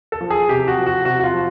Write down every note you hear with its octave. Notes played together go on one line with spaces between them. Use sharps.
A4
F3
G#4
C3 G4
F#4
F3
F#4
C3 F#4
F#4
F4
F3